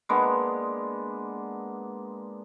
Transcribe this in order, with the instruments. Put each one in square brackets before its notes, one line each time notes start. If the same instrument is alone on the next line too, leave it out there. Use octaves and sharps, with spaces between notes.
[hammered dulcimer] G#3 A#3 B3 D4